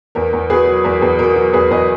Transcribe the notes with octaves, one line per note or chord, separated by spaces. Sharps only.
E2 A#4
E2
B2 G#4 B4
F#3
E2 A#4
E2 G#4
B2 A#4
F#3 A#4
E2 G#4 B4
E2 B4 D#5